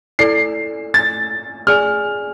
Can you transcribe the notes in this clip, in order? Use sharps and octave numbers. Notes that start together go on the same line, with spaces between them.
E4 A4 D5 C7
A6
G#4 D5 G#5 F6